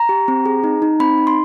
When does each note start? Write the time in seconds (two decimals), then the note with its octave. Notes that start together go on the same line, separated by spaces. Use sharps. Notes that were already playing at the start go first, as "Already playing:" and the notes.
Already playing: A#5
0.09 G4
0.28 C4
0.46 G#4
0.64 D#4
0.82 D#4
1.00 C4 B5
1.18 D#4
1.27 C6